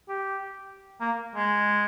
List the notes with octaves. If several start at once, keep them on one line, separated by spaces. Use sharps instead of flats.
G4
A#3
G#3